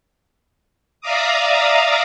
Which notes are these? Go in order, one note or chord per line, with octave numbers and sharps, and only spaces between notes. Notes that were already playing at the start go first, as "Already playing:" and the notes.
D5 E5 F5 A#5 D6 D#6